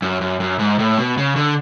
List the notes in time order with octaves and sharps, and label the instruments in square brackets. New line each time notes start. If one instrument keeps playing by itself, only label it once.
[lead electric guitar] F#2
F#2
F#2
G#2
A2
B2
C#3
D3